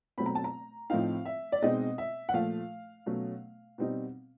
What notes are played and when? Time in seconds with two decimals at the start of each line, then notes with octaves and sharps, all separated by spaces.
0.18 B2 F#3 A3 C4 B5
0.26 A#5
0.35 A5
0.44 A#5
0.90 A2 F3 A3 C4 D#4 F5
1.25 E5
1.52 D5
1.62 B2 G#3 C4 D#4 D#5
1.98 E5
2.29 F#5
2.34 A#2 F3 A3 F5
3.06 B2 F#3 A3 C#4
3.78 B2 G3 C4 D#4